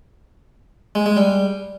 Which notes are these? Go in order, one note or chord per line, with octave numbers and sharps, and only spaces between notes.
G#3
G#3
G3